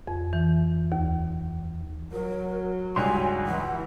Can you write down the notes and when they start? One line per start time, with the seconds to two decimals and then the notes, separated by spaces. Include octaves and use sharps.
0.07 F2
0.33 E3
0.92 D#2
2.12 F#3 A#4
2.96 C#2 G2 D#4 C#5 G#5 C6
3.46 E3 F#5